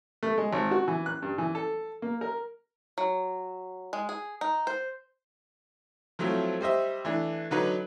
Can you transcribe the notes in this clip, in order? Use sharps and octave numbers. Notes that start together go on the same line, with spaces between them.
A3
G#3
G#1
F#4
E3
F#6
G2
E3
A4
A#3
A#4
F#3
G#3
G#4
D#4
C5
F3 F#3 A3 C4 E4
G3 C5 D#5 E5
E3 A3 D4
D3 F#3 D#4 B4